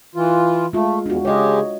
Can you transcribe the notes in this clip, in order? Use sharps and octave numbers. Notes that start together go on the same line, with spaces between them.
E3 F4
G#3 A3 F4
E2 D4 F#4
C#3 G#3 G4 C#5 D#5